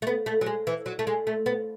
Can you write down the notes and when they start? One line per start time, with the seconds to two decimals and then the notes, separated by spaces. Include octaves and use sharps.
0.02 A3
0.07 B3
0.26 A3
0.41 F#3
0.46 G#3
0.67 E3
0.86 F#3
0.99 A3
1.07 G#3
1.27 A3
1.46 B3